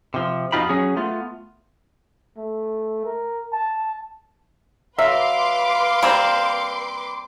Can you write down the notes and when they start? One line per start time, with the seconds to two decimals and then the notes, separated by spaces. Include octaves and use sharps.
0.14 C3 F3
0.52 F2 B2 D#4 F4 G4 B5
0.69 F#3 C#4 G#4
0.96 A3 B3 F4
2.37 A3
3.05 A#4
3.52 A5
4.99 F#3 B4 E5 F5 C6 D6
6.02 G3 A#3 C4